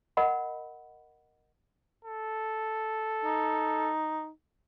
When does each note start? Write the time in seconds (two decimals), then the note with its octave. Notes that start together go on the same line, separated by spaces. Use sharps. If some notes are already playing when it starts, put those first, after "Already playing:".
0.17 A#4 D#5 F#5 B5
2.05 A4
3.25 D#4